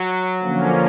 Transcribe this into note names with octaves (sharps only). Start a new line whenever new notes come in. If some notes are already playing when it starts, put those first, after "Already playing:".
Already playing: F#3
D3 F3 A#3 C#4